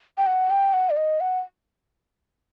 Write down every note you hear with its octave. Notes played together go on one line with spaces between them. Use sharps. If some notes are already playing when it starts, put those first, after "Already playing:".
G5
F#5
G5
F#5
D5
D#5
F#5